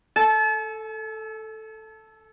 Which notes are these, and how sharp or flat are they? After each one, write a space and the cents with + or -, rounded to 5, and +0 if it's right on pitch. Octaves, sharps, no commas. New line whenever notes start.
A4 +0 A5 -45